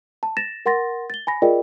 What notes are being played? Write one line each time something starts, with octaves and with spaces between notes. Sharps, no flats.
A5
A6 A#6 E7
A#4 F#5 C6 A6 A#6
A6 G7
G#5 B5 A#6
F4 G#4 A#4 D5 D#5 G5